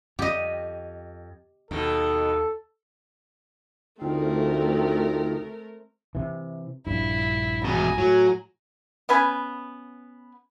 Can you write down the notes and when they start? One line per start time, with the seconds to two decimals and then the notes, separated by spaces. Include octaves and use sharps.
0.19 F2 G4 D#5
1.71 D#2 B2 D#3 A4
4.02 D2 D3 A3 C4 D#4 F4 A#4
6.15 C3 E3
6.87 A#1 G2 E4
7.65 E2 B2 G#5 A#5
7.98 A2 F#3
9.09 B3 C#4 B4 G#5